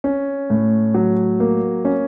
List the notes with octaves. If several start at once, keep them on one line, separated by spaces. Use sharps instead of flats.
C#4
A2
F#3
A#3
C#4